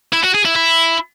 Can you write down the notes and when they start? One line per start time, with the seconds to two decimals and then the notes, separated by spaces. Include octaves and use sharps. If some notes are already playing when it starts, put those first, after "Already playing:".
0.13 E4
0.24 F#4
0.34 G#4
0.45 E4
0.56 E4